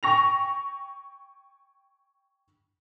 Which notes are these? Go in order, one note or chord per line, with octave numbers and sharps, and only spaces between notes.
G5 G#5 C#6 A#6 F7